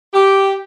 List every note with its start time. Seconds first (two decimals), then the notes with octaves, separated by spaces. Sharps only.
0.14 G4